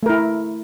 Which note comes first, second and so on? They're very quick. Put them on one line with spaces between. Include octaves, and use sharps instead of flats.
A3 A#4 E4